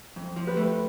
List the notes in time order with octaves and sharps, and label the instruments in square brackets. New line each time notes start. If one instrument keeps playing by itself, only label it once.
[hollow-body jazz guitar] F2
F3
[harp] G4 B4
[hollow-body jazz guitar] A3